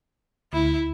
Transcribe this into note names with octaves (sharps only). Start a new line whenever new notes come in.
D2 E4